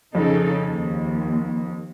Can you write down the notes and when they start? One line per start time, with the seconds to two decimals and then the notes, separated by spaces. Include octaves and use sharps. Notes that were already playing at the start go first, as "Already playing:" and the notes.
0.15 F2 C#3 D#4 A4
0.68 D#2